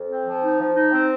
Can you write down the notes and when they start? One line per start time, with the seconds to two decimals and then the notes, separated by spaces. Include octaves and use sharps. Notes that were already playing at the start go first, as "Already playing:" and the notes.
Already playing: F2
0.09 C4
0.26 F3
0.43 D#4
0.60 F3
0.76 D#4
0.93 C4